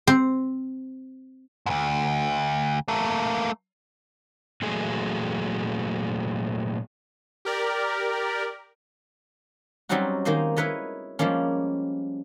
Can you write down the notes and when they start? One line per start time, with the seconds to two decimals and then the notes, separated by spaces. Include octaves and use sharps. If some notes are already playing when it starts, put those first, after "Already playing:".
0.07 C4
1.66 D2 G#2
2.88 A3 A#3
4.62 A#2 E3 F#3 A3 G#4
7.45 G4 A#4 D5
9.89 F#3 G3 C4 C#4 D#4 F#4
10.25 D#3 G#3 A#3 C5 D#5
10.56 E4 A#4 B4 C#5 D#5
11.19 F3 G3 G#3 A#3 C#4